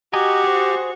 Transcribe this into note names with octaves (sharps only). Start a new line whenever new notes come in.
F#4 G4 D#5 G#5 A#5 C#6
G#4 C5